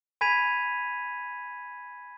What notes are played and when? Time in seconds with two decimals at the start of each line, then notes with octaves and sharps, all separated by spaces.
0.21 G#5 B5 G#6 B6 D#7 F7